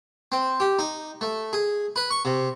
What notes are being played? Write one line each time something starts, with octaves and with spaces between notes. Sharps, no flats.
C4
G4
D#4
A3
G#4
B4
C#6
C3